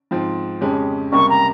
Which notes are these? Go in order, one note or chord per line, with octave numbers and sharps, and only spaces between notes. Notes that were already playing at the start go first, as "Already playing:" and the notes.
G#2 F3 C4
F2 C#3 G#3 C#4 G4
C#2 C3 G3 A#3 C#6
A#5